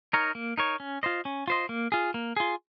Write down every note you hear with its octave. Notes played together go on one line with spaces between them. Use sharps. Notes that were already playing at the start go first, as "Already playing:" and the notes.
D#4 A#4 C#5
A#3
D#4 A#4 C#5
C#4
F4 C5 D#5
C#4
F4 C5 D#5
A#3
F4 G#4
A#3
F4 G#4